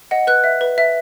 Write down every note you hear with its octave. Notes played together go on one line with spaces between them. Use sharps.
D#5 F#5
B4 F#6
E5
B4
E5